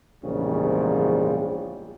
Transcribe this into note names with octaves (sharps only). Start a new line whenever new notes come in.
A#1 E2 G#2 C#3 G3